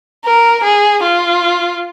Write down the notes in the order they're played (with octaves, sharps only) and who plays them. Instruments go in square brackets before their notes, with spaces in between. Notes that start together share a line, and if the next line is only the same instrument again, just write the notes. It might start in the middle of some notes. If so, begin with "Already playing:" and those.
[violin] A#4
G#4
F4